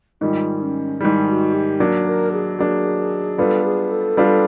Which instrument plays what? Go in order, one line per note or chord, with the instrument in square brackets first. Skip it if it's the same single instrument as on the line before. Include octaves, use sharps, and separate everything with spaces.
[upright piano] G#2 D#3 G3 [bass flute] F4
[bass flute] C#4
[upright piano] G#2 D#3 G3 [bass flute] E4
[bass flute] F#4
G4
[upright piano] F#3 A#3 D4
[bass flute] A#4
G#4
[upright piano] F#3 A#3 D4 [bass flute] G#4
[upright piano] G3 B3 D4 F4 [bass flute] A4
[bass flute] G#4
A4
[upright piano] G3 B3 D4 F4